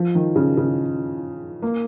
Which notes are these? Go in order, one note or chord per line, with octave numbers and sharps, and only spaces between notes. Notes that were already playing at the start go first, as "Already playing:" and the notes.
Already playing: F3
D#3
C#3
C#3
A#3